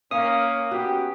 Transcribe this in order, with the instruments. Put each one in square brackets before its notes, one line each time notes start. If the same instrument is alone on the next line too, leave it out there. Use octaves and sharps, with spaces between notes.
[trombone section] A#3 C#4 [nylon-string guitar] F5 [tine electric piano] D#6
[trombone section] B3 C#4 G4 [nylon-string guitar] F#4